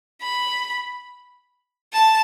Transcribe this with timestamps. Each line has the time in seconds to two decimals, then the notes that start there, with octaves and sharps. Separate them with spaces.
0.23 B5
1.93 A5